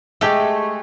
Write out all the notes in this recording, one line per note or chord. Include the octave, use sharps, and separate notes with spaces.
G#3 A3 G4 A4